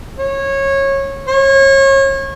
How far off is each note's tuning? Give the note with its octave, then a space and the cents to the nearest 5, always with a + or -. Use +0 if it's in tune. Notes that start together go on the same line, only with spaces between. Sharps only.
C#5 -20
C#5 -30